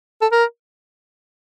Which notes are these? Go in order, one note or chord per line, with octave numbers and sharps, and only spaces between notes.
A4
A#4